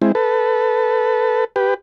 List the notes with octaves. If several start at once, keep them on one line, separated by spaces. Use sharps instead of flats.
G#3 C4 E4
A4 B4
G4 B4